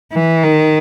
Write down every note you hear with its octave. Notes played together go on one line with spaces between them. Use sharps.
E3
D#3